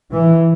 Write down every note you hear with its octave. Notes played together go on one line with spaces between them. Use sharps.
E3